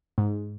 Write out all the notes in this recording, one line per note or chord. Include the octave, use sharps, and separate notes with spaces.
G#2